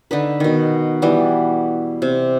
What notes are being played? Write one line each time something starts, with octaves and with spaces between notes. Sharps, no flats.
D3 D#4 B4
B2 D#3
E3 G3 B3
C3